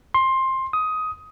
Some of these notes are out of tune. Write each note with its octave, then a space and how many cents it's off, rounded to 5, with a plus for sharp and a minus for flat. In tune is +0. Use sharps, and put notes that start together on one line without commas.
C6 +15
D#6 +15